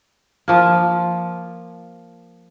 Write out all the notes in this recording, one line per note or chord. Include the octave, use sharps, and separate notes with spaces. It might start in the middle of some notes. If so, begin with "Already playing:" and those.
F3 A#3